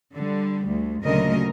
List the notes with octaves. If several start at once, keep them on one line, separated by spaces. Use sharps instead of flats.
D3 G3
D2
D2 A#2 C#3 F#3 A#4 D#5